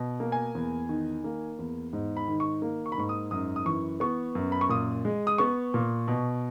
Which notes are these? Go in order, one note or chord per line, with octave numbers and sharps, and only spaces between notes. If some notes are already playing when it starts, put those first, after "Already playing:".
Already playing: B2
A#3
G#5
E2
D#3
A#3
E2
G#2
B5
D#3
C#6
A#3
C#6
B5
G#2 C#6
D#6
F#2 D#6
D#6
E3 C#6
B3 C#6
F#2
B5
C#6
A#2 D#6
G#3
D#6
B3 C#6
A#2
B2